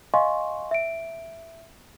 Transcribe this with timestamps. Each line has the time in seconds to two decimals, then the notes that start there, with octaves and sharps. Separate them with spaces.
0.14 D#5 F5 G#5 C6 C#6
0.71 E5 D7